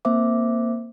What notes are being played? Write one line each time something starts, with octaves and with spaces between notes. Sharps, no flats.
A#3 C4 C5 E5 D6